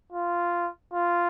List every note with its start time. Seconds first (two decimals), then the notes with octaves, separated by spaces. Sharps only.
0.12 F4
0.93 F4